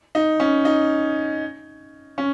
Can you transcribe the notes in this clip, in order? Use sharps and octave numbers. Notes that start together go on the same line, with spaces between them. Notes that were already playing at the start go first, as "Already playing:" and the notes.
D#4
C#4
D#4
C#4